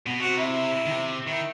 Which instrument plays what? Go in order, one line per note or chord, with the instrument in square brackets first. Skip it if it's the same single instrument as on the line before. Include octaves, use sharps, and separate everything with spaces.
[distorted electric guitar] B2
[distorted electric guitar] C3 [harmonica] F#4
[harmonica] E4
[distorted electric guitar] D#3
C3
[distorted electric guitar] D#3 [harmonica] E4